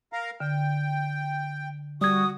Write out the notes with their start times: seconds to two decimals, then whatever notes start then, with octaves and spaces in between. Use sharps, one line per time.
0.13 A#4 F5 A#5
0.40 D3 G5
2.01 G3 F#4 D#6 G#6